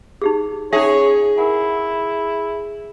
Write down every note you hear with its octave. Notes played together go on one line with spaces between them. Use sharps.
D#4 G4 G#4
C#4 D#4 G#4 C#5 E5
E4 A#4 F#5 G#5